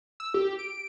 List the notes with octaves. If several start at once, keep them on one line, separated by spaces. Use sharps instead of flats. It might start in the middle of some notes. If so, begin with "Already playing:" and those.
E6
G4
D7